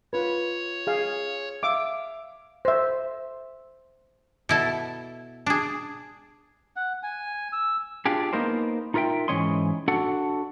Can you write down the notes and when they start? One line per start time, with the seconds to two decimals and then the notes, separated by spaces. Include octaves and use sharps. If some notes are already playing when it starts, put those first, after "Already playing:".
0.13 F4 B4 C#5
0.87 G#4 F5
1.63 E5 F5 D6 E6
2.65 C5 E5
4.49 B2 E4 A4
5.46 D4 G#4
6.76 F#5
7.03 G#5
7.52 E6
8.05 D4 F4 G4 G#4
8.33 A#3 B3 D#4 A#4 C5
8.94 D#4 F4 A#4 E5 G5
9.28 G#2 E3 C#4 C#5 D#5 C6
9.88 D4 F#4 A4 F#5